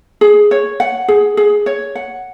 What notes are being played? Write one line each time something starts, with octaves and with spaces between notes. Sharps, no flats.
G#4
C#5
F#5
G#4
G#4
C#5
F#5